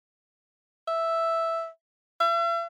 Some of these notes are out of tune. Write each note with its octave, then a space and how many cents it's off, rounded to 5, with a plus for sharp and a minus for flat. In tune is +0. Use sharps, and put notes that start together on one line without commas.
E5 +0
E5 +45